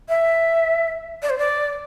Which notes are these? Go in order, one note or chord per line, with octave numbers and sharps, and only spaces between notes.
E5
D5
C5
D5